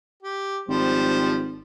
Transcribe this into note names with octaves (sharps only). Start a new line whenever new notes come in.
G4
G#1 F3 G3 C5